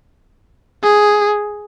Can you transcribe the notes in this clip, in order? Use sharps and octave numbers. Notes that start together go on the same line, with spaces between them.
G#4